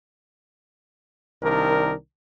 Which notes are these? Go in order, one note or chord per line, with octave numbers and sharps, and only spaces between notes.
C2 D#3 D4 A#4